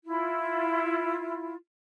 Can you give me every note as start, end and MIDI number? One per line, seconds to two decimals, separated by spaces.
0.05 1.55 64
0.05 1.55 65